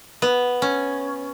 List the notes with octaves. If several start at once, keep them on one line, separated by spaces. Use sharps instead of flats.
B3
C#4